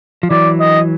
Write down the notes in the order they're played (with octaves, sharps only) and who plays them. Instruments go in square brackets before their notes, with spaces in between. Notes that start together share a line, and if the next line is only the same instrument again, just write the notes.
[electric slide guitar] F3
[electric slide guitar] E3 F#3 [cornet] D5
[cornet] D#5